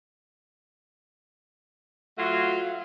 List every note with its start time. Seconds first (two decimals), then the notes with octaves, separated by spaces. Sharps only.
2.18 F#3 A3 F4 F#4 F5